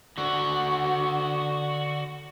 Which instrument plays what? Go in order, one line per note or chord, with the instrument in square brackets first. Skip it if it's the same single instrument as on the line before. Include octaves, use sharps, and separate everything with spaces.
[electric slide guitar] D3 F#4